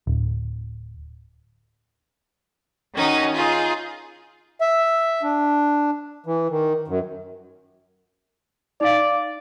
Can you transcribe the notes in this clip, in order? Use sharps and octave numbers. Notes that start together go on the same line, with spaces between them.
D1
D#3 C#4 D#4 F#4
D#4 F4 G#4
E5
D4
E3
D#3
F#2
D#4 D5 F5